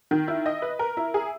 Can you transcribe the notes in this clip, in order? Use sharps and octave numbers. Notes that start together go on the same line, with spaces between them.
D#3
E4
D#5
B4
A#4
E4
G#4